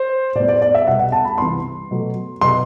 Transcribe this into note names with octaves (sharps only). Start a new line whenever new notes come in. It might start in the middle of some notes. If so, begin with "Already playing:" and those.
Already playing: C5
A2 G3 B3 D5
D5
D5
E5
C2 B2 G3 F#5
F#5
A5
B5
C2 C3 E3 C6
B2 F#3 A3
B2 F#3 C6